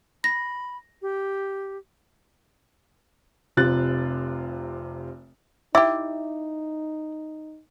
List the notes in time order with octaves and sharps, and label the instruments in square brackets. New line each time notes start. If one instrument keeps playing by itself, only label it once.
[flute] B5 [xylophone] A#6
[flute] G4
[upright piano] F1 C3 F4 F#6 A6
[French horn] D#4 [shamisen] E4 G4 [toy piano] E5 [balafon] D6